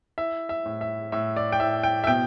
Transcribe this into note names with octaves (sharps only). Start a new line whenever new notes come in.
E4 E5
E5
A2
E5
A2 E5
D5
G5
A2 E5
G5
E5
B2 G5